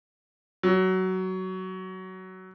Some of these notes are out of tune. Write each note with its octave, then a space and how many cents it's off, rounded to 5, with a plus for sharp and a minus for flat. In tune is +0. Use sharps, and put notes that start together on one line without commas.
F#3 +15